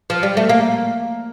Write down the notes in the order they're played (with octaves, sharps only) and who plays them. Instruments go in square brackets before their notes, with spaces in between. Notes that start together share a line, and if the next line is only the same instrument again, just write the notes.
[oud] F3
G3
A3
A#3